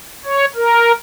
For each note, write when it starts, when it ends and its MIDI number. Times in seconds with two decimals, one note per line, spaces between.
0.25 0.45 73
0.55 0.92 70